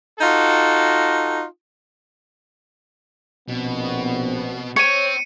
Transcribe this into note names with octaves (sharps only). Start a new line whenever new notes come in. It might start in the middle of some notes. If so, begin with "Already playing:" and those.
D#4 F4 F#4 A4
A#1 B2 B3 C4
C4 C#5 C#7 D#7